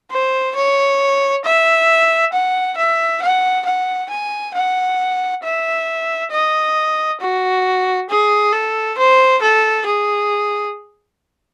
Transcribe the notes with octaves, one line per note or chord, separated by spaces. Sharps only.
C5
C#5
E5
F#5
E5
F#5
F#5
G#5
F#5
E5
D#5
F#4
G#4
A4
C5
A4
G#4